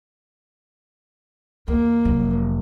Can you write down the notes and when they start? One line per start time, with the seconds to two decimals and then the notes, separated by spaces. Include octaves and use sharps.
1.68 E2 A#3
2.05 F1 F#3